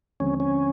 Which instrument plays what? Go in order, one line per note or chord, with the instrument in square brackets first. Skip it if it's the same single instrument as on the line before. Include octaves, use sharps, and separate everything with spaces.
[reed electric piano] D#2 D3 F3 G#3 C4 [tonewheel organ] C#4
[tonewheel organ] C#4